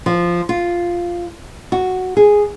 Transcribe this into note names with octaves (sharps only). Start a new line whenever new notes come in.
F3
F4
F#4
G#4